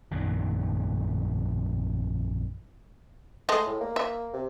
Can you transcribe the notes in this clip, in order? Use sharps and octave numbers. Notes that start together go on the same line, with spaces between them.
A#1 F#2 D#3
G#3 A3 D#5
A2
A#3
E5
C3